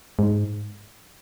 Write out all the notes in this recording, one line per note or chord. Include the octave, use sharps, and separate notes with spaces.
G#2